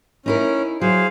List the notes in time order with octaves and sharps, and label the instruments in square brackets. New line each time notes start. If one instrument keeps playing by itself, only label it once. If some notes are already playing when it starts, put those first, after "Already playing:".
[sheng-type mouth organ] C#4 [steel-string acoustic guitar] D#4 E4 A#4
[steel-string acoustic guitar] F#3 [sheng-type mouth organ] G#4 C5 F5